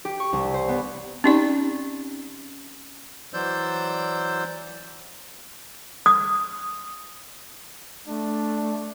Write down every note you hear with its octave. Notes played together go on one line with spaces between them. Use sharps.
G4
C#6
C2
C5
B3
C4 C#4 D#4 G4 D5 A#5
E3 F#3 C5 D5 E6 G6
D#6
A3 D4